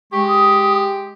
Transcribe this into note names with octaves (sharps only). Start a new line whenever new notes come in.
G#3 G4 C#6
D#6